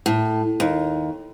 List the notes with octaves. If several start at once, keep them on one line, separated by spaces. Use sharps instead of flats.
A2
D#2